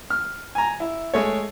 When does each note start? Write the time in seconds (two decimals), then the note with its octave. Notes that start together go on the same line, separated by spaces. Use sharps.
0.10 F6
0.55 G#5 A#5
0.80 E4
1.14 G#3 A3 C#5